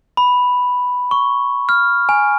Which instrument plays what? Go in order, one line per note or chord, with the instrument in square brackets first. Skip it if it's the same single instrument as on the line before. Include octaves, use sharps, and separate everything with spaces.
[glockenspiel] B5
C#6
F6
G#5